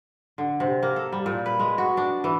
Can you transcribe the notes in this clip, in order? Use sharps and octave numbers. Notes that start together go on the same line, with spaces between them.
D3
C3
A#3
A4
G3
A#2
B4
G#3
F#4
D4
E3